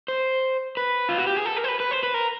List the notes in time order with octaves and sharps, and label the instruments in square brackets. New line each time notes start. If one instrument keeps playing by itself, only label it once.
[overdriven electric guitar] C5
B4
F4
F#4
G4
G#4
A4
A#4
C5
B4
B4
C5
B4
A#4